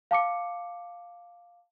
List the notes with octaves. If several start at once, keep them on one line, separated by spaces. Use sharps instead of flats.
F5 A5 D6 C#7